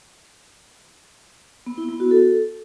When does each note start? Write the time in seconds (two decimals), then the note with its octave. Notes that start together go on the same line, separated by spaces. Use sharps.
1.66 B3
1.78 E4
1.89 B3
2.00 F#4
2.11 A4